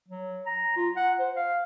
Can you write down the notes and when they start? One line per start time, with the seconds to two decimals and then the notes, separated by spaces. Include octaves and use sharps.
0.08 F#3
0.46 A#5
0.76 F4
0.97 F#5
1.19 C5
1.36 F5